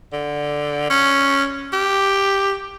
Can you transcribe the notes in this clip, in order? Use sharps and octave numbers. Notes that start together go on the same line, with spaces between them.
D3
C#4
G4